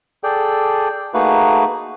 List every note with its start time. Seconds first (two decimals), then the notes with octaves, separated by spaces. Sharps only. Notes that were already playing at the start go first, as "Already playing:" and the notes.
0.23 G#4 A4 D5 G5
1.14 A3 A#3 D#4 F#4 G#4 B4